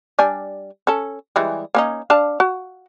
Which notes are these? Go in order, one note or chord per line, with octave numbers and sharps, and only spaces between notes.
G3 D4 G#5
C#4 A4
E3 G3 G#3
A#3 C#4 D#4
D4 F5 A5
F#4